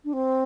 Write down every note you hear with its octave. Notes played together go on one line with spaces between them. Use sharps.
D4
C4